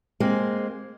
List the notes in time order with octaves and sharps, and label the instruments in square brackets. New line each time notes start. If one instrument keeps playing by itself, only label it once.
[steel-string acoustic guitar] G#3 A#3 C4